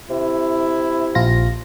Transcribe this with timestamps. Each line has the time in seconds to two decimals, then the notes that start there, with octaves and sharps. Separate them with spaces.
0.10 C3 E4
1.15 A#1 F4 A#6